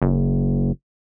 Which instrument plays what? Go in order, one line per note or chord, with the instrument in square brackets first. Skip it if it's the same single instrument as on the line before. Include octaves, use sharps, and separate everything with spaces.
[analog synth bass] F#1